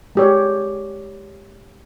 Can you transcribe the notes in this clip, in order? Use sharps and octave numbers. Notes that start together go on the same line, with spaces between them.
G#3 G4 C#5